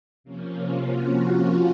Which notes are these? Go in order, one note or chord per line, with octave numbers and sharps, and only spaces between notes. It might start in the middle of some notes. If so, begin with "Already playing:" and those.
C3 F3 A#3 C#4
F4
F#4
F4